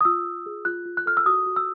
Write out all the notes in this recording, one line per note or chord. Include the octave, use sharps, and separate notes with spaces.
D#6
F4 E6
F4
G#4
F4 F#6
F4
F#6
A4 F6
E6
F#4 D#6
F#4
E6